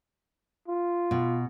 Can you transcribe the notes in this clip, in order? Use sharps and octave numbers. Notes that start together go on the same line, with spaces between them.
F4
B2